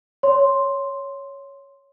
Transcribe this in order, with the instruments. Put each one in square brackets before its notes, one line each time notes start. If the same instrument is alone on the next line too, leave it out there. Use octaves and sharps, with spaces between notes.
[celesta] C#5 C6